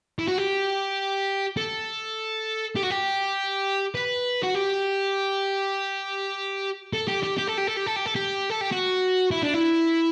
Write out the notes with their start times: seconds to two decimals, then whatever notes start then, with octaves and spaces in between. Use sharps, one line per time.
0.19 E4
0.28 F#4
0.38 G4
1.57 A4
2.76 G4
2.83 F#4
2.91 G4
3.95 B4
4.43 F#4
4.55 G4
6.93 A4
7.08 G4
7.23 G4
7.38 G4
7.47 A4
7.57 G4
7.67 A4
7.76 G4
7.86 A4
7.96 G4
8.06 A4
8.15 G4
8.50 A4
8.61 G4
8.72 F#4
9.31 E4
9.43 D4
9.54 E4